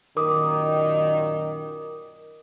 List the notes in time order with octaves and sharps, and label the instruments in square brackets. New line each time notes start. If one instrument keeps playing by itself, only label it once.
[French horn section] F#2 A#2 D#3 [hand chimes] A#4 D6 D#6